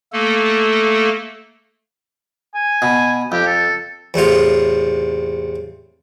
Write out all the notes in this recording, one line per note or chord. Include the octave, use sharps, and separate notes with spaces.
A3 A#3 A4
G#5
B2
F2 G4
A4
E2 A2 C3 F4